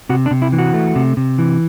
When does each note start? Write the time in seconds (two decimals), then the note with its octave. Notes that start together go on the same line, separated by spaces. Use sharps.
0.09 C3 F#4
0.26 D4
0.31 C3
0.42 E4
0.52 E3
0.58 F#4
0.74 A3
0.95 C3
1.17 C3
1.38 E3